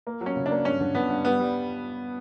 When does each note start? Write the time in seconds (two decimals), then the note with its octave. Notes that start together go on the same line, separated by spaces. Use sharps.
0.07 A#3
0.21 F#3
0.26 C#4
0.36 C#3
0.46 D4
0.51 A#3
0.65 G2 C#4
0.80 D3
0.95 D3 B3
1.10 G2
1.25 G3 B3
1.39 G3